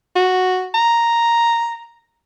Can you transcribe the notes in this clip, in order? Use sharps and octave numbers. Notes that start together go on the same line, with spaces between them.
F#4
A#5